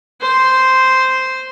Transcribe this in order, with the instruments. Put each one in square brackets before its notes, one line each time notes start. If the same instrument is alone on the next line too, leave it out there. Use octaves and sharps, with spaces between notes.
[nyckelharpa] C5